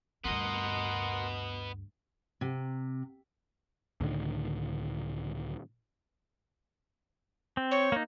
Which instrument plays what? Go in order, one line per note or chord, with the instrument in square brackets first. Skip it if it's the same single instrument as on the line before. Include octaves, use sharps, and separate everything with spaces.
[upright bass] D2 G2 [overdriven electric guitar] B3 D#5 [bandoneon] A#4 F#5 C6
[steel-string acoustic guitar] C3
[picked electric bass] C#2 A2 D3 D#3
[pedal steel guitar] C4
[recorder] C#5
[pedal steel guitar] A#3 D#4